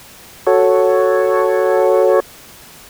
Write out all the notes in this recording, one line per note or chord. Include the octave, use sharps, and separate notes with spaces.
F#4 A4 C#5